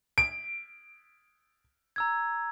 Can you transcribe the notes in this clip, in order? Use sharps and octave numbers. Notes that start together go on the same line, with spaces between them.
D7
A#5 E6 G#6